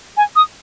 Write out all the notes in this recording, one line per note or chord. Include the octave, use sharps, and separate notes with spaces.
G#5
D#6